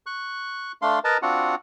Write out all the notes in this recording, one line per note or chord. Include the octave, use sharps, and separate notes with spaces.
C#6 F#6
A3 D4 F5 C6
A#4 B4 D#5 A5 A#5
C4 D4 F4 F#4 F#5